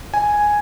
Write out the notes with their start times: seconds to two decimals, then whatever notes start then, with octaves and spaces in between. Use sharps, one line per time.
0.14 G#5